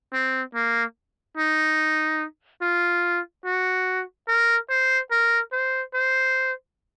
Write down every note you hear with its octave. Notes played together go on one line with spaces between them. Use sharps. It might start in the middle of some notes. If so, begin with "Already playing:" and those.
C4
A#3
D#4
F4
F#4
A#4
C5
A#4
C5
C5